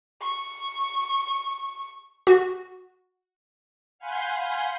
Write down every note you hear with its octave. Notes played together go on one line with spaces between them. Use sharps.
C#6
F#4
F5 F#5 G#5 B5 C6 G6